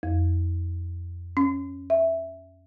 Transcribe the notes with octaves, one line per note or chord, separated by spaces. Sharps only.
F2
C#4
E5